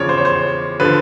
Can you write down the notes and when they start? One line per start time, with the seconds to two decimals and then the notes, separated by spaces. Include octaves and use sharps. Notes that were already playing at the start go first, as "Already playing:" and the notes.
Already playing: E2 C#3 F3 C#5 D5
0.09 C5
0.18 C#5
0.25 C5
0.80 D3 F3 B4